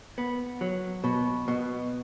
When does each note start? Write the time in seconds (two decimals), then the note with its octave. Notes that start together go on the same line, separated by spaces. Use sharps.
0.18 B3
0.61 F#3
1.04 B2
1.48 B2